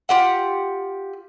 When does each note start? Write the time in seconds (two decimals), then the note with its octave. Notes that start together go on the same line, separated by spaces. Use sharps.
0.09 F4 G4 F#5